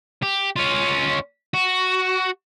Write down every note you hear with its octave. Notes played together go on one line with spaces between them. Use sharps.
G4
C#4 F4
F#4